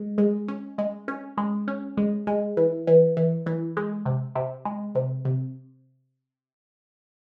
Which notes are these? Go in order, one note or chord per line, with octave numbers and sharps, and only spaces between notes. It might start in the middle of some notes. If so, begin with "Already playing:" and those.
Already playing: G#3
G#3
C#4
G#3
C#4
G#3
C#4
G#3
G#3
E3
E3
E3
E3
G#3
C3
C3
G#3
C3
C3